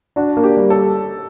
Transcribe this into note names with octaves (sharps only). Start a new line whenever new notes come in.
D4 F#4
A#3
G4
G3
A4